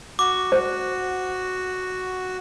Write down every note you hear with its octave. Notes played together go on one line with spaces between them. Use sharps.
F#4 D6
C5